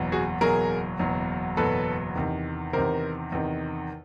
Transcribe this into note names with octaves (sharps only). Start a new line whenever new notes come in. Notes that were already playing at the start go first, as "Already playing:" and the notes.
Already playing: F#1 E2 B2 F#3
F#4 G#4
F#1 E2 B2 F#3 G#4 A#4
F#1 E2 B2 F#3
F#1 E2 B2 F#3 A4 B4
E2 C3 D#3
E2 C3 D#3 A#4 C5
E2 C3 D#3